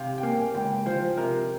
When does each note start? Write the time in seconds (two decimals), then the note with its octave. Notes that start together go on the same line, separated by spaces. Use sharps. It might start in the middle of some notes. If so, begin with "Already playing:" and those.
Already playing: C3 F5 G5
0.18 G5
0.23 A#3 G#5
0.55 C#2 G5
0.86 F3 C5
1.17 C3 A#4